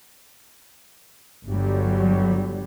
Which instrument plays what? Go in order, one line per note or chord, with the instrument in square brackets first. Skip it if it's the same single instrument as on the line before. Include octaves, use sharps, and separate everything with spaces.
[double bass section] G1 D3 F#3 G3